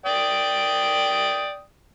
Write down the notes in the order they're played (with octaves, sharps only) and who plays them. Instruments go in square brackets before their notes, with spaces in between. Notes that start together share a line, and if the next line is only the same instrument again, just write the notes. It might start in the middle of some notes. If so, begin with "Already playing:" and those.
[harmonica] D5 G5 D#6